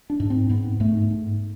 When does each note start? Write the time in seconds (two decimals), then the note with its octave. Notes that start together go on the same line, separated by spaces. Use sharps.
0.10 D4
0.20 G#2
0.30 C4
0.49 G#2 B3
0.80 G#2 A3
1.10 G#2